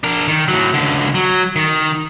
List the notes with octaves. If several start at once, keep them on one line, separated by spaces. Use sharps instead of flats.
D4 A#4
D#3
A2 F#3
C#2 D3
F#3
D#3